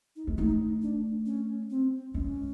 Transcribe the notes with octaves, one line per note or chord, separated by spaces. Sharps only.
D#4
G#3
A3 D#4
D4
C#4
C4
G#3 C#4